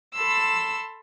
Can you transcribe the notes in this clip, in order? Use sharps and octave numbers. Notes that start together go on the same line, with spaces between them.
A4 A5 B5 C6 E6